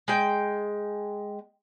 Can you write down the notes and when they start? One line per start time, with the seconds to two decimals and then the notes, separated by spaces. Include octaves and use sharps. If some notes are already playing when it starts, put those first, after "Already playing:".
0.08 G#3 G5